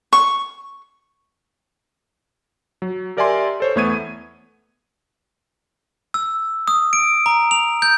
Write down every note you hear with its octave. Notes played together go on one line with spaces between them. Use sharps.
C#6
F#3
G4 A#4 D5 E5 G#5 C6
A4 C5 C#5
E2 A3 B3 C#6 G#6 D#7
E6
D#6
D7
A#5
F7
G6